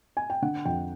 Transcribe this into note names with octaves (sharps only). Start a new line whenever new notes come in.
G#5
G5
D3 F#5
F2 G5